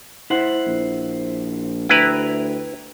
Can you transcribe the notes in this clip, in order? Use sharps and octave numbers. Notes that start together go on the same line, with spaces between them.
E4 C5 F#5
A#1
D2 E4 B4 G5 A#5